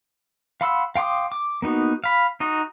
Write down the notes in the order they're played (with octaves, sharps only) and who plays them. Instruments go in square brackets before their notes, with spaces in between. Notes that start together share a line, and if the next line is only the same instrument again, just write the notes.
[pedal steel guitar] F5 F#5 B5 C6 E6
F5 G5 C6 D6 D#6
D6
A#3 B3 D#4 F#4
F5 B5
D#4 F#4 D#5